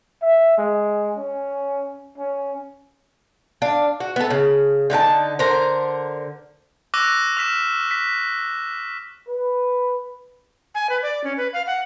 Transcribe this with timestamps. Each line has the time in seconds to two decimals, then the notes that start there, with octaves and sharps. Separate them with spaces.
0.22 E5
0.57 G#3
1.17 C#4
2.18 C#4
3.62 D4 F5
4.00 F#4
4.16 B3 A4
4.30 C#3
4.90 D3 D#4 B4 A5
5.39 D3 A#4 C5 A#5
6.94 C#6 D6 E6 F#6 A#6 D#7
7.37 D6 F6 B6 E7
7.91 B6
9.27 B4
10.75 G#5
10.90 B4
11.03 D5
11.24 C#4
11.37 B4
11.53 F5
11.67 F#5